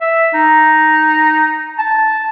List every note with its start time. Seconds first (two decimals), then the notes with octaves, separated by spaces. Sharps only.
0.01 E5
0.34 D#4
1.78 A5